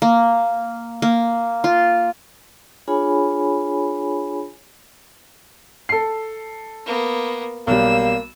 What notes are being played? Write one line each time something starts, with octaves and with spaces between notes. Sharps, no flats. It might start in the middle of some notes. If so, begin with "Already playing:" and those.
A#3
A#3
F4
D4 F4 G#4 C#5 G#5 B5
A4 C7
A#3 B3
B1 G3 A#3 E6